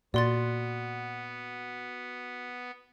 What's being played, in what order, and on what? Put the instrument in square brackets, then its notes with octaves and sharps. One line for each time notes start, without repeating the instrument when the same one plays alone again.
[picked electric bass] A#2 [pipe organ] B3 [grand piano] F#4 [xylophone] D5 C6 A6